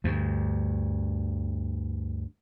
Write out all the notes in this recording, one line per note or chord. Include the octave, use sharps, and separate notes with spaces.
D2 G2